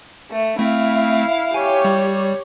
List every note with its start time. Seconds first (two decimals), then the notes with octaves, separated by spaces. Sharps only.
0.31 A3
0.59 A3 C4 E4 F5
1.54 G4 C#5 G#5
1.85 G3